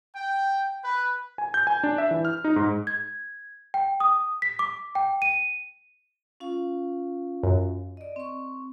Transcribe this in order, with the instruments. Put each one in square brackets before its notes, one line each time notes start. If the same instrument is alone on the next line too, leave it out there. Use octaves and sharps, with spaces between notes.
[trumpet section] G5
B4
[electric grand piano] G#5
G6
G#5
D4
E5
E3
F6
D#4
G#2
[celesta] G#6
G5
D#6
B6
D6
G5
D#7
[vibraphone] C#4 F4 F5
[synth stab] F#2
[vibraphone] D5 D#5
C4 C#6